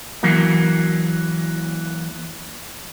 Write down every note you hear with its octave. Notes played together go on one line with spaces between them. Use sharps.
E3 F#3 A#3